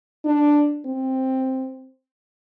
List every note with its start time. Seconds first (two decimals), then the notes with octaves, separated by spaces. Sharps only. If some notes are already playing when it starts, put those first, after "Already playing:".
0.25 D4
0.86 C4